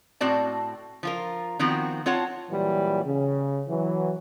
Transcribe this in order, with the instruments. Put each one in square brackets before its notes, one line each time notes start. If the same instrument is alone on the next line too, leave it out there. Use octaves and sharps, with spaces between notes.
[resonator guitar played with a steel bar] A2 C4 F#4 D5 A5
F3 F4 A#4
D#3 F3 B3 C4 F#4
C4 F4 C#5 F#5 A5
[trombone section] A#2 E3 F#3 G3
C#3
E3 F#3